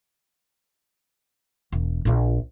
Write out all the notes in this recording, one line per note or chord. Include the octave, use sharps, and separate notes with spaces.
E1
A#1 F4